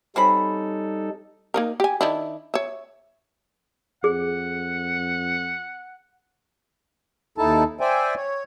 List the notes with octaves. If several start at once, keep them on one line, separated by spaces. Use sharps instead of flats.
G3 C4 C#4 D#4 A4 B5
A#3 D#4 A#4
G4 G#5
D#3 D4 E4
C#5 E5
F2 G#4 F#5
D#2 D#4 E4 A4 A5
C5 D5 E5 G5 G#5
C#5